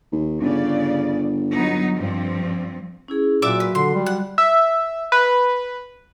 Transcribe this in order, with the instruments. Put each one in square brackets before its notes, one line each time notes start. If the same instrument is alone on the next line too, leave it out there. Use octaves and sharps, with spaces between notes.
[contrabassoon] D#2
[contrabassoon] G1 [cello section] C#3 D5
[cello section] F#3 B3 D#4
G2 F3 C4
[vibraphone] C#4 E4 G#4
[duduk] A#2 [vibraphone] F#3 F4 F#4 [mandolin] D5 E5 D6
[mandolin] B4
[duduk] D3 [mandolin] C6
[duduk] G3
[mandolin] F#5
[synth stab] E5
B4